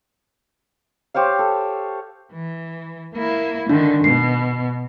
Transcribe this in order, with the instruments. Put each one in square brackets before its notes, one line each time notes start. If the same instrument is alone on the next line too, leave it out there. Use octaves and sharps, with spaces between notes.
[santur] G4 C5 C#5 F5
A4
[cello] E3
A#3 E4
[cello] D3 D#3 [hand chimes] D4
[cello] B2 [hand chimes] C7